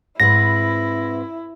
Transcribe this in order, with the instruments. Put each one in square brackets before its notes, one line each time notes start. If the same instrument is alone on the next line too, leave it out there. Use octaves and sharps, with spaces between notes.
[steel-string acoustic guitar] G#2 C4 B4 [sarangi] E4 [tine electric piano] A#6